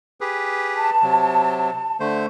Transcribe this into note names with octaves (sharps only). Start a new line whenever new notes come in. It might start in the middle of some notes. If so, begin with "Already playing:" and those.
G4 G#4 B4
A5
C3 F#3
D3 A3 C5